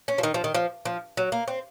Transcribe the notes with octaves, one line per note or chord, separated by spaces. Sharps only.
C#4
F3
D#3
F3
D#3
F3
F3
F#3
A#3
C4